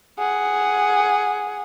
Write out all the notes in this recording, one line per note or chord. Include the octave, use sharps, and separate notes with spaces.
G#4 F#5